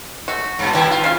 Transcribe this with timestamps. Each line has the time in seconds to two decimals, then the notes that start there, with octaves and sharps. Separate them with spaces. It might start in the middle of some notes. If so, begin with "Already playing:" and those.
0.28 A3 F#4
0.59 G2 B2
0.73 A2 D#3 E3 E4 G4
0.91 F4
1.04 C#3 F5